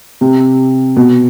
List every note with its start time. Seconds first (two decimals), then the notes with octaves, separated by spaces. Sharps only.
0.21 C3
0.97 B2